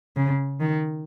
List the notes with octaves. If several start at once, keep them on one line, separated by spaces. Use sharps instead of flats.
C#3
D#3